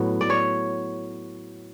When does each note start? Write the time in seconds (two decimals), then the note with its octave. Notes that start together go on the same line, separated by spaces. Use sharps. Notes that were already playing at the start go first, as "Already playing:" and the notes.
Already playing: A2 F#3 B3
0.21 D5
0.30 C#5